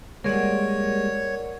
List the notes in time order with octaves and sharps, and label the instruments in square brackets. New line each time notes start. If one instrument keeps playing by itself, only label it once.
[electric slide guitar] G3 G#3 A#3 [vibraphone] A#4 D5 F#5 [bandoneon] C#5